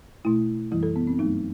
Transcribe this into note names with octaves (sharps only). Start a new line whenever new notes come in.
B2 A3 E4
F#2 E3 G3 E4
A4
B3
C4
G2 F#3 A3 D#4